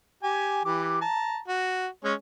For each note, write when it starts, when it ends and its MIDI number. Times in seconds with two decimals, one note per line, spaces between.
0.23 0.65 67
0.23 0.65 80
0.65 1.01 52
0.65 1.01 67
0.65 1.01 86
1.01 1.38 81
1.01 1.38 82
1.48 1.87 66
2.04 2.13 56
2.04 2.13 61
2.04 2.13 73